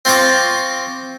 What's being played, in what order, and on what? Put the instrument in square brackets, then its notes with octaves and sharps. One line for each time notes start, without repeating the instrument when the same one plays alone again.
[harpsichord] C4 F4 A#5 C#6 D6